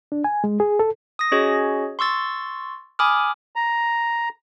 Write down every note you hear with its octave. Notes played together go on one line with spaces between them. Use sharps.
D4
G#5
G#3
G#4
A4
D#6 A#6
C#4 F#4 G#4 C#5 D#5
C6 C#6 E6 A6
G#5 B5 D6 D#6 F6
A#5